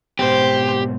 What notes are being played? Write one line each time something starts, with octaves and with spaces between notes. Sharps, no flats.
G#2 B2 C4 G4 C5